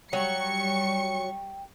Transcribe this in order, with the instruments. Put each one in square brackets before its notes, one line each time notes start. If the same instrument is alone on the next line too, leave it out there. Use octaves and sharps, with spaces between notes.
[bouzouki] F#3 [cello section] G3 [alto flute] G5 [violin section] C#6 C#7